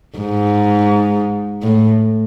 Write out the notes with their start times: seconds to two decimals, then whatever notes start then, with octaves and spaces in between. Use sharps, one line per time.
0.18 G#2
1.63 A2